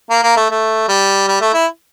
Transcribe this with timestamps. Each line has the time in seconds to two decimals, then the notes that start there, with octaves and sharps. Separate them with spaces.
0.10 A#3
0.23 A#3
0.37 A3
0.50 A3
0.88 G3
1.28 G3
1.41 A3
1.54 E4